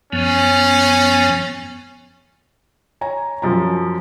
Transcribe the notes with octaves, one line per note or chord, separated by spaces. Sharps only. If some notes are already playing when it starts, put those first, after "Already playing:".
F#2 F3 B3 C#4
C#5 G#5 A#5
F#2 F3 A#5